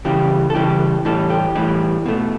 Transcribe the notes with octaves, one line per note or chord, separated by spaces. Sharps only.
C#3 E3 G3 G4
A4
C#3 E3 G3 G4
A2 E3 G3 A4
G4
A2 E3 G3
B2 A3